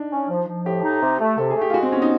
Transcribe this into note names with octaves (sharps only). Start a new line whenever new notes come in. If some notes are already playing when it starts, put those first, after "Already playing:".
Already playing: D4 D#4
C#4
F3
F3
A2 G4
D#4
C3
A3
C3 A4
G#4
A3
G4
F4
G#3 F#4
C4
B3 C#4
D#4